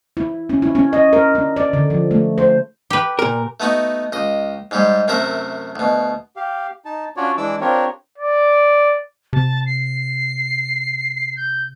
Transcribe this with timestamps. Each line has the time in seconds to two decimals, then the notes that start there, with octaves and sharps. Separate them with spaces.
0.17 E4
0.49 C#4
0.62 E4
0.75 C#4
0.93 D#5
1.13 A#4
1.35 D4
1.56 D5
1.73 D3
1.90 F3
2.11 A3
2.38 C5
2.90 G4 B4
3.19 A#2 A#4
3.60 A3 B3 D#4 F#4
4.12 C#2 D#5
4.71 G#2 G3 G#3
5.08 F#2 C3 A3 A#4 E5
5.76 D2 B2
6.36 G4 F5
6.85 D#4 A5
7.17 C#4 D4 F4 F#4 C#5 D5
7.37 E3 G#3 D4 E4 D6 E6
7.61 C4 D4 F4 G4 A#4 C#5
8.18 D5
9.33 C3 A5
9.66 C7
11.37 G6